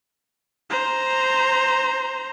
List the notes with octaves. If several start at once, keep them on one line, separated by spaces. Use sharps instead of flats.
C5 A#5